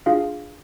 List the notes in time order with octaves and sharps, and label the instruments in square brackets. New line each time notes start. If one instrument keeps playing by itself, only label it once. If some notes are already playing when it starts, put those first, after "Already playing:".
[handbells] D4 F4 G#4 F5